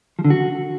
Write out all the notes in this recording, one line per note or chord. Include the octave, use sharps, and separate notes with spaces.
F3
D3
F#4